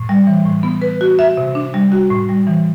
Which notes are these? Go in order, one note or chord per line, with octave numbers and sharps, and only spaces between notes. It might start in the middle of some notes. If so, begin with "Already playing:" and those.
Already playing: A2
G3
E3
A2
B3
B4
F#4
E5
C3
D4
G3
F#4
A2
G3
E3